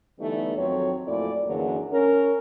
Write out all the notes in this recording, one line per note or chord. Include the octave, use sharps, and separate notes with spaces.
D3 E3 G3 A3 B3 D#4
F2 D#3 F#3 C4 C#5
F2 A#2 A3 E4 F#4 D5
F#2 D3 E3 F#3 A#3 G#4
C#4 A#4